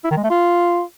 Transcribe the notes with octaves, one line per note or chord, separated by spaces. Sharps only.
E4
D#3
G#3
A3
F4